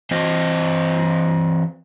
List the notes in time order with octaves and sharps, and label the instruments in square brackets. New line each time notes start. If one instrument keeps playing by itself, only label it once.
[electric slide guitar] E3 C4 C5 D#5